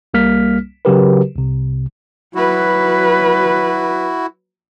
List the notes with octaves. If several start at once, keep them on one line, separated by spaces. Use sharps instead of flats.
C2 G3 A#3 F6 B6
C#3 F#3 F#4 G4 A#4 B4
C2 C3
F#3 E4 F#4 B4